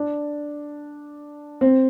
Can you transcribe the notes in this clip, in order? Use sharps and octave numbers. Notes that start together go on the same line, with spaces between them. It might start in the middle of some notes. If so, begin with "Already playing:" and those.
Already playing: D4
C4